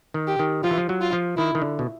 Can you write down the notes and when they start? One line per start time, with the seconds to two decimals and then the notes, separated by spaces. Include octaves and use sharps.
0.14 D#3
0.27 G4
0.39 D#3
0.64 F3 F4
0.71 E3
0.77 F3
0.89 F#3
1.01 F4
1.13 F3
1.37 D#3 E4
1.55 D#3
1.62 D3
1.79 B2